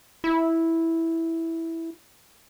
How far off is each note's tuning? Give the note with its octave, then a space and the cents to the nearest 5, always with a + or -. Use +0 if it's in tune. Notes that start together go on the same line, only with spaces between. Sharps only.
E4 -5